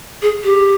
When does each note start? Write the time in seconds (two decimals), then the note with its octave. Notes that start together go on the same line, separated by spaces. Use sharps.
0.22 G#4
0.44 G4